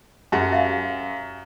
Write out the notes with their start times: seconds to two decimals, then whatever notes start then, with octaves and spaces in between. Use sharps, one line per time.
0.32 F#2 G4 E5 F#5 G#5
0.52 E5 F5